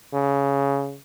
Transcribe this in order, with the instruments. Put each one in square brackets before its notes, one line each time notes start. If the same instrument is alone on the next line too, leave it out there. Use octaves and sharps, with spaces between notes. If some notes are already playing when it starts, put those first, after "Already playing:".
[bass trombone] C#3